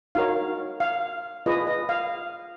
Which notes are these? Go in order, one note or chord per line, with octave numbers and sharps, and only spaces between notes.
D#4 F#4 A#4 C#5 F5
F5
F4 G#4 B4 D#5
D#5
F5